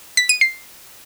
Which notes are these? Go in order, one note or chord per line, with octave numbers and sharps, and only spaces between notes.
B6
D#7
C7